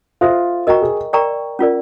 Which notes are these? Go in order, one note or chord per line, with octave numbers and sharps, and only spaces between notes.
F4 A4 C5 E5
F#4 A#4 D#5 G5 A#5 C#6
G#4
A#4 D5 G5 A#5 C#6
C#4 F4 A#4 D5